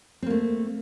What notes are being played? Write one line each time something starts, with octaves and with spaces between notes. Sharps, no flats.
A3 A#3 C4